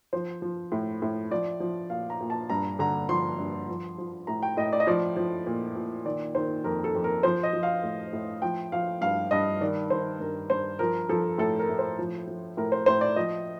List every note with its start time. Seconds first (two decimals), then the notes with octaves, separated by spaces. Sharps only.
0.13 F3 C5
0.42 F3
0.72 A2
1.02 A2
1.31 F3 D5
1.60 F3
1.90 A#2 F5
2.10 A#5
2.21 A#2
2.30 A5
2.50 G2 A#5
2.79 D3 A#5
3.09 F3 C6
3.38 G2
3.68 F3
3.98 F3
4.27 A2 A#5
4.43 G5
4.57 A2 D#5
4.73 D5
4.80 D#5
4.87 F3 D5
5.16 F3
5.47 A#2
5.75 A#2
6.05 D#3 D5
6.35 D#3 C5
6.64 F2 A#4
6.84 A4
6.95 F2
7.04 A#4
7.23 F3 C5
7.43 D#5
7.53 F3
7.63 F5
7.83 A2
8.13 A2
8.42 F3 G5
8.72 F3 F5
9.01 G2 F5
9.31 G2 D#5
9.61 D#3 D5
9.90 D#3 C5
10.20 G2 A#4
10.50 G2 C5
10.79 F3 A#4
11.09 F3 A4
11.38 A2 A4
11.59 A#4
11.69 A2
11.79 C5
11.99 F3
12.27 F3
12.57 A2 A#4
12.72 C5
12.86 A2 C5
13.01 D5
13.16 F3 D#5